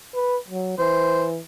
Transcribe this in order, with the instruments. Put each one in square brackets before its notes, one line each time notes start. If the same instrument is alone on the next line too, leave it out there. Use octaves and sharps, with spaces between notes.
[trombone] B4
F#3
[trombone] E3 [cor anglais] C5